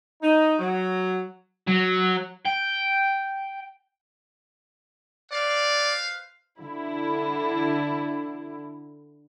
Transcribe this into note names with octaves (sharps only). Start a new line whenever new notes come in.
D#4
F#3
F#3
G5
B4 C5 D5 F5
D3 E4